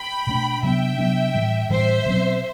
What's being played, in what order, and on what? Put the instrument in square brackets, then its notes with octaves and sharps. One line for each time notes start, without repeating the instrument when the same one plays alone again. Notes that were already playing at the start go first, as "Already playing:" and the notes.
Already playing: [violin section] G5 B5
[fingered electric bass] B2 A3 D4
[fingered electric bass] C3 F#3 B3 D4 [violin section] E5 G5
[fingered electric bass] C3 F#3 B3 D4
A2 E3 G3
[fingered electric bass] A2 E3 G3 [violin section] C5 E5
[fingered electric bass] B2 F#3 C4